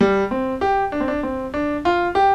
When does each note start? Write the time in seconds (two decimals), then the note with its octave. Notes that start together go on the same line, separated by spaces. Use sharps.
0.01 G3
0.31 C4
0.61 G4
0.92 D4
1.00 C4
1.08 D4
1.23 C4
1.54 D4
1.85 F4
2.15 G4